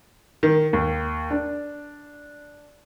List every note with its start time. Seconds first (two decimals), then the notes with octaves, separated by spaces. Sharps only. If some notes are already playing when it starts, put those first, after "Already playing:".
0.43 D#3
0.73 D#2
1.30 D4